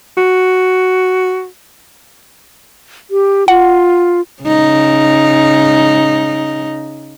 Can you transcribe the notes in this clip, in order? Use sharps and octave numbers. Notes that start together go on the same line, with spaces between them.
F#4
G4
F4 F#5
C#3 D#4